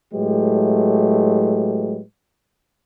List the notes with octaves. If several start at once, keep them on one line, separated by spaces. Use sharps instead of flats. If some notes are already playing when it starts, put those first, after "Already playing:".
A2 F#3 G#3 A3 G4 B4